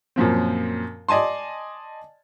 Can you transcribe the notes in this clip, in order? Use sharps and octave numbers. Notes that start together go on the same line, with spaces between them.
F#2 A#2 F3 C4
D5 D#5 G#5 A5 C6